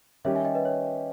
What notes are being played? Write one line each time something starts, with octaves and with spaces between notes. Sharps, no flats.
D#3 G3 C#4 G4 C#5 E5
E5 G#5
D#5 G5
B4 D#5
C#5